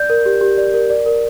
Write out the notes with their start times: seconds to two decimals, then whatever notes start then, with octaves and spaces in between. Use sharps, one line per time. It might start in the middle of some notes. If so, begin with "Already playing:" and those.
Already playing: D5 G6
0.10 A#4
0.26 G4
0.41 G4
0.58 D5
0.74 A#4
0.90 D5
1.06 A#4